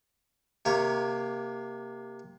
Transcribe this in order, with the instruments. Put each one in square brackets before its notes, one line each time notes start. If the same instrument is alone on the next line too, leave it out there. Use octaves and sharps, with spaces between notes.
[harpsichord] C3 A#3 C#5